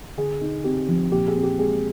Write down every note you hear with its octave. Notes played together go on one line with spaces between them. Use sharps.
D3 G#4
D#4
C4 G4
F3
A#2 G4
G#4
C4
G4
G#3 G#4